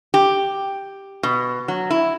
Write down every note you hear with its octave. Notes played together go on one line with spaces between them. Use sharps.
G4
B2
F#3
E4